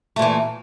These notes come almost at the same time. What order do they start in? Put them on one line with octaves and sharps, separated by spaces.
A3 A#2 E3